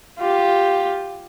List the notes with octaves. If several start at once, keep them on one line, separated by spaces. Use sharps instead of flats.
F4 G4